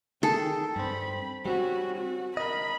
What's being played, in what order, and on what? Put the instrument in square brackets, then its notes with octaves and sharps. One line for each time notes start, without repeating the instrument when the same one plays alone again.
[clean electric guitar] D#3 G#4 [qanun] A4 [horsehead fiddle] G5
[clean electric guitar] G2 C4 [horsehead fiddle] B5
[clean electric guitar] G3 C4 C#4 [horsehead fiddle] F#4
[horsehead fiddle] F#4
[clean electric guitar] A#4 D#5 [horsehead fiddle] B5